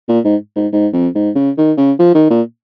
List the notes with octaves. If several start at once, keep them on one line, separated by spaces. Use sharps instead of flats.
A#2
G#2
G#2
G#2
F2
G#2
C#3
D#3
C#3
F3
D#3
A#2